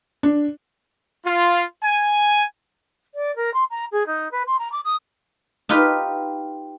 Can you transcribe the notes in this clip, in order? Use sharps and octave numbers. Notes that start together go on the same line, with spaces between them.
D4
F4
G#5
D5
A#4
C6
A#5
G#4
D#4
B4
C6
A#5
D6
D#6
D#4 F4 G4 B4